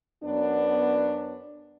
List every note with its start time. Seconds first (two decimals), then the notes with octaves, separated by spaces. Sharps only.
0.23 F#2 B3 D4